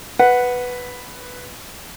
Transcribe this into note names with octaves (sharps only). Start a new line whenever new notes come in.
B4 F#5